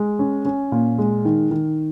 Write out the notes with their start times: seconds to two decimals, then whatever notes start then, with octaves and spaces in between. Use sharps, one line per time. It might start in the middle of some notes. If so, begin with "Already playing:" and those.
Already playing: G#3
0.19 C#4
0.45 C#4
0.72 A#2
0.98 G#3
1.25 D#3
1.51 D#3